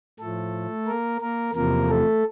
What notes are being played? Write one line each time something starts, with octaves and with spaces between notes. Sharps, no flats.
A2 F3 A3 A4
A#3 A#4
A#3 A#4
E2 C3 F3 A#3 A#4
A3 A4